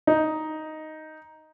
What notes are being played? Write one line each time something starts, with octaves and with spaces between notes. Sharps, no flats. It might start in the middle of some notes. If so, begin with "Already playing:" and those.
D#4